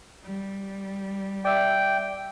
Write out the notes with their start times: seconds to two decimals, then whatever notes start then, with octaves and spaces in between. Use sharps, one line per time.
0.25 G3
1.45 D5 E5 G5